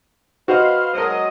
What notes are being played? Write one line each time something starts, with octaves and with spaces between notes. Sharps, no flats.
F#4 B4 C5 D#5 F5 C6
F#3 G#3 A#4 C5 D#5